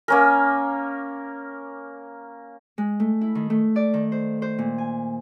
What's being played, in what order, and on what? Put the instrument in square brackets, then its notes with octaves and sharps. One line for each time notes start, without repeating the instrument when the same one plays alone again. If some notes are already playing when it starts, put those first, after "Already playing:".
[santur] A#3 C#4 A#4
[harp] G#3
A3
E4
D#3
A3
D5
D#3
C5
C5
A#2
G#5